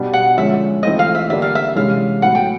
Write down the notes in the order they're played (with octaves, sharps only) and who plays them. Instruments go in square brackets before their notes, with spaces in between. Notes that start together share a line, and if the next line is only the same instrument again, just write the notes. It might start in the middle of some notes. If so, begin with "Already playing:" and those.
Already playing: [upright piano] B2 G3 B3 D4
[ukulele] F#5
[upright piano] D3 F3 G#3 C#4 [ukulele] E5
[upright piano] E3 A3 C4 F4 [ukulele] D#5
[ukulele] F5
E5
[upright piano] D3 G3 A#3 D4 [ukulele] E5
[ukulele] F5
E5
[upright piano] C3 E3 G#3 C#4 [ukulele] F5
[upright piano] A2 F#3 B3 [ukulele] F#5
[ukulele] G5